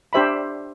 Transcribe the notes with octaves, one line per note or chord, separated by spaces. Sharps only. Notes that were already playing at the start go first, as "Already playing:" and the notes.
D4 G4 C5 E5 B5